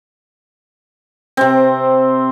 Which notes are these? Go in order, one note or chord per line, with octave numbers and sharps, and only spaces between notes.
C3 C4